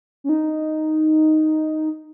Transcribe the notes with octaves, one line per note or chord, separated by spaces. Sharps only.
C#4
D#4